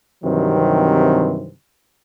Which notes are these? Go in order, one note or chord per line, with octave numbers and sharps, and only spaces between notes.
G2 C3 D#3 E3 F#3 C4